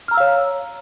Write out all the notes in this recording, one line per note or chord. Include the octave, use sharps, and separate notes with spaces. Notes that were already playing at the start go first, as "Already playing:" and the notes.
C#5 F5 A#5 E6 F6